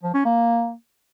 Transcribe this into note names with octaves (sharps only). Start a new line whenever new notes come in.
F3
C#4
A#3